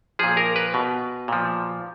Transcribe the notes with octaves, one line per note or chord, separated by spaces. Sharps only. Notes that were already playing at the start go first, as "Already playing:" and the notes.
A#2 F3 G#4
A#4
B4
B2
A#2 F3